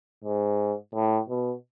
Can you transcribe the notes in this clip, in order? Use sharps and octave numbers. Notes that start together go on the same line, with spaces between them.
G#2
A2
B2